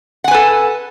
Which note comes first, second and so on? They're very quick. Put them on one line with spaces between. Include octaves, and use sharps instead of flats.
F#5 G#5 B4 A4